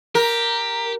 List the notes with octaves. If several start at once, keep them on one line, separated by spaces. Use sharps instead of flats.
G4 A#4